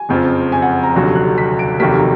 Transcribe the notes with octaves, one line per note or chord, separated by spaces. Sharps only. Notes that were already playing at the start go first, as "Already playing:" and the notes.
Already playing: G#5
F#1 F2 F3
G#5
F#5
A#5
F1 D#2 D3 F#3
F#6
B6
D7
F1 D#2 D#3 F#3 A#3 B6